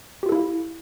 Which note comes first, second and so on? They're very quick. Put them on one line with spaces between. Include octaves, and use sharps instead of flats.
G4 F4 A4 E4 F5